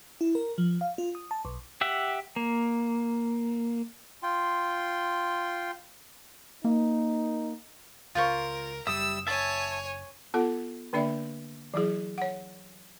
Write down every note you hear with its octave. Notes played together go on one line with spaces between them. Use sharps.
E4
A#4
F3
F5
F4
D#6
A5
B1
G4 E5 F#5
A#3
F4 G5 C6
A#3 D#4
C#2 F4 A#4 C5 C#6
F#1 G3 E5 D#6 E6
C#5 E5 G#5 A5
B3 F4 A4 F#5
D3 A#3 D4 D5 E5
E3 F#3 E4 G#4
C#5 F#5